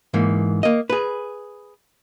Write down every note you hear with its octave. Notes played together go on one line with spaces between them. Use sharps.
G#2 E3 A#3
A#3 D#5
G#4 B4